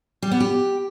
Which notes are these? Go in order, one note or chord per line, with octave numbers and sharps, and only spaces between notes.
G3
B3
G4